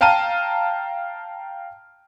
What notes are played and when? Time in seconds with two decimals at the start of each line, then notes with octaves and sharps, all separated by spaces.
0.01 F5 G5 A5 A#5 F6 D#7